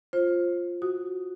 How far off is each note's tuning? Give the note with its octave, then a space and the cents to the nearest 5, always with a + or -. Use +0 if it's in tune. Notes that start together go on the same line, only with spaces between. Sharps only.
F4 +0 C5 +20
F#4 -5 D#6 +0